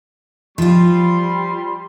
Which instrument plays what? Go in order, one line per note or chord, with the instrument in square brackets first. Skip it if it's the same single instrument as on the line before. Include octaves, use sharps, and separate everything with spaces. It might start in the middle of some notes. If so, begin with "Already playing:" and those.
[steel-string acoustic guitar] F3 F4 [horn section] G3 B5 C6